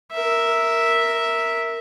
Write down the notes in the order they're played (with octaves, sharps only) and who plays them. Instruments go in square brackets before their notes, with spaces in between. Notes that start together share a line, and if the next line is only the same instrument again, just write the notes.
[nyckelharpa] A#4 E5